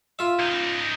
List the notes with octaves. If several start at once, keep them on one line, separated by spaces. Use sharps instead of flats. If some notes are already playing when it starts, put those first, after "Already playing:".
F4 E5
C#2 D#4